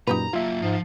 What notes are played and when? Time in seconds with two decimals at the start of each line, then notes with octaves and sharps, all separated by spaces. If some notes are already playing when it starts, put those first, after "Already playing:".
0.07 F#2 A#2 D#4 G4 B4 A#5
0.33 F#3 A#3 F4 E5
0.62 G#2 F3